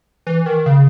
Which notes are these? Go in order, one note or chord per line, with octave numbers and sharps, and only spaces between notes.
E3
D#3
C#3